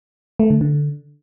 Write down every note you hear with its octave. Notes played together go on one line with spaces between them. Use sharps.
A3
D3
D3